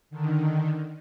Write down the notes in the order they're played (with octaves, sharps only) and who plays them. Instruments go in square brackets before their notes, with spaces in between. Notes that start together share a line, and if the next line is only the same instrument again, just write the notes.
[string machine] D3 D#3